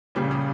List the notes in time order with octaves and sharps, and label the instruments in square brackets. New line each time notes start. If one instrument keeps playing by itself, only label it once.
[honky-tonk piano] A#1 A#2 G3 C#4 [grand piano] C#3
[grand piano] C#3